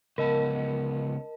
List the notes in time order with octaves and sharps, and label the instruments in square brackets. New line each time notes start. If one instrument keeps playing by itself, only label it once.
[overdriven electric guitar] C#2 B3 [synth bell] A#4 D#5 A5